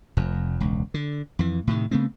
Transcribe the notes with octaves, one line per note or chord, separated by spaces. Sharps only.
F1 F2
E1 C#2
D3
F2 E3
A2 C3 D#3
C#3 A3 B3 C4